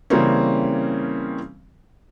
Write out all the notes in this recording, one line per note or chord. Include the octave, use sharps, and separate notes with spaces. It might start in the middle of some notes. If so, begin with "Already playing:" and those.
C#3 E3 G3 A#3 C4 C#4